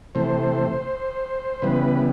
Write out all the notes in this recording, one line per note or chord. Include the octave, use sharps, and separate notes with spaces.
C3 E3 A3 C5
C#3 E3 G3 B3 B4